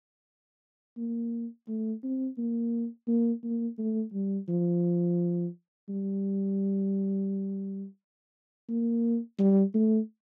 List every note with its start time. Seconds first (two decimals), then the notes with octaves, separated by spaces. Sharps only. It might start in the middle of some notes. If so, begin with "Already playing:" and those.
0.98 A#3
1.69 A3
2.04 C4
2.38 A#3
3.08 A#3
3.44 A#3
3.79 A3
4.14 G3
4.49 F3
5.89 G3
8.69 A#3
9.39 G3
9.75 A3